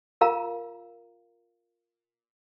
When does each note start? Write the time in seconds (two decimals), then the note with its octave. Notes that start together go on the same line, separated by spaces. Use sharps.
0.21 F4 A#4 F5 A#5